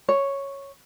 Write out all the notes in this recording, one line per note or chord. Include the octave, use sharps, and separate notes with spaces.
C#5